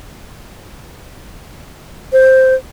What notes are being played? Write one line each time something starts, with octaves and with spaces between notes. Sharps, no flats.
C5